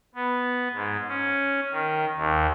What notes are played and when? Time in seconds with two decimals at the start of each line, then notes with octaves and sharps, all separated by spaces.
0.15 B3
0.74 G#2
1.08 C#4
1.72 D#3
2.16 D#2